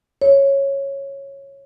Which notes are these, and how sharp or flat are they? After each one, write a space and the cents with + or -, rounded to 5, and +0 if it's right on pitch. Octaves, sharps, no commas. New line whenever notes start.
C#5 -10